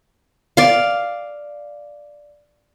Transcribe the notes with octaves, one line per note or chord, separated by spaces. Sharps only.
D5 F5